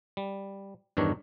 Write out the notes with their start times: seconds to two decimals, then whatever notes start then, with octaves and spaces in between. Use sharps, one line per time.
0.17 G3
0.97 E2 G2 D#3 D4 C#5